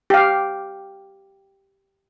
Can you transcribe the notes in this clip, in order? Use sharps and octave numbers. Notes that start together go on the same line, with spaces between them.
G4 F5